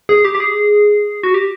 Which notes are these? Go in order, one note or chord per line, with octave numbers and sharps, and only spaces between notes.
G#4
G4
G4
G#4
F#4
G4